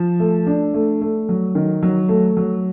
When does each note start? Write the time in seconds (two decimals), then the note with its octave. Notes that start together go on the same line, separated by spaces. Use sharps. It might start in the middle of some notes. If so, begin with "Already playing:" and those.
Already playing: F3
0.20 A3
0.47 D4
0.74 A3
1.01 A3
1.29 F#3
1.55 D#3
1.83 F#3
2.09 A3
2.37 F#3